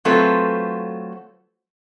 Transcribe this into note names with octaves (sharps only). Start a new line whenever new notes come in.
F#3 A3 C4 F4 A4 B4